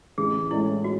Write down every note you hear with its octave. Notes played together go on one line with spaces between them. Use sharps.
A1 G#4
A2 G#3 C#4 E4
F#4